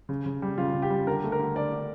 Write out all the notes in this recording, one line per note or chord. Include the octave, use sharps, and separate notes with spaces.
C#3
C#3
G3
C#3 F4
C#3
G4
G3
D3 A#4
A3
A#4
D3
D3 D5
D3